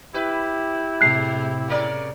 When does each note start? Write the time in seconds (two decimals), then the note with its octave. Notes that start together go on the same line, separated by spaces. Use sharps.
0.14 E4 G4 B4
1.01 A2 C3 G#3 F#6 C7
1.68 C#3 A#4 D5